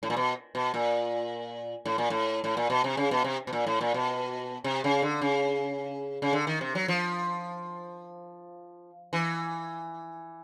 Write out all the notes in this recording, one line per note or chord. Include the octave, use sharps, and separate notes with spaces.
A2
A#2
B2
B2
A#2
A2
A#2
A2
A2
A#2
B2
C3
C#3
B2
C3
B2
A#2
A2
A#2
B2
C3
C#3
D3
C#3
C#3
D3
D#3
C3
F#3
F3
E3